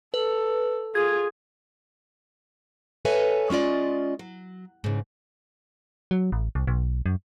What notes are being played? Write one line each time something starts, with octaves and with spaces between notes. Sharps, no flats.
A4 B4
F4 G#4 G#6
A4 B4 C#5 D#5 E5 G#5
G#3 C#4 F4 D5 D#5
F#3
G#2 C#3
F#3
A1
C2
B1
F#2